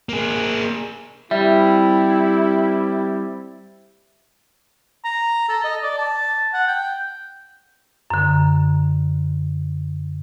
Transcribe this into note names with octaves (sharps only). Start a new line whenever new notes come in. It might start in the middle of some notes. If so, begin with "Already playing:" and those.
A#3 G#4
G3 C4 E4 G4 E5
A#5
A4
D#5
D5
A5
F#5
G5
F#2 D3